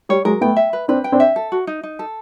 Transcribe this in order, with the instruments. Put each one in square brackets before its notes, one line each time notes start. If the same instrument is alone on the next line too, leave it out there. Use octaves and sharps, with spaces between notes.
[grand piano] G3 [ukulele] C#5
[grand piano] F#3 G#3 [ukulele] A#4
[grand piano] A3 B3 [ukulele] G5
[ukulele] E5
B4
[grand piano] C4 D4 [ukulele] B4
[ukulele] G5
[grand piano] C4 D4
[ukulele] E5
A4
F#4
D#4
D#4
A4